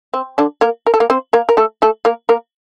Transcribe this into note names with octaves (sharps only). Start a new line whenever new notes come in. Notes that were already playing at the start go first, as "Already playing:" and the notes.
C4
D3 D4
A#3 A#4
A#4
A4
A#3 A#4
C4 C5
A#3 A#4
A#4
A3 A4
A3 A4
A#3 A#4
A#3 A#4